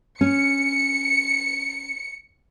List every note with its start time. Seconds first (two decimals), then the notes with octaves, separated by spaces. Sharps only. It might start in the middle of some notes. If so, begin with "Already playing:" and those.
0.21 C#4 C#7